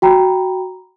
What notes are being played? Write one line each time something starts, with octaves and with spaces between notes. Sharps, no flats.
F#4 G5 A#5 B5